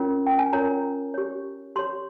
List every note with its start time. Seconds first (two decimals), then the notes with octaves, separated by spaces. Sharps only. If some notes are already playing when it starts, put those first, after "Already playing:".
Already playing: C#4 F4 A#4 C#5
0.27 G5
0.39 G#5
0.52 C#4 F4 A#4 C#5 A#5
1.14 G4 C#5
1.76 G4 C#5 C6